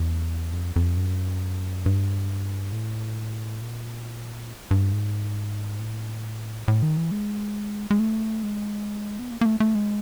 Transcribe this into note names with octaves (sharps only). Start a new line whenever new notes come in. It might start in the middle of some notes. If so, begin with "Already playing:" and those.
Already playing: E2
F2
F2
F#2
G2
A2
A#2
G2
G#2
A2
A2
D#3
E3
G#3
G#3
A3
G#3
B3
A#3
A#3
A3
A3
G#3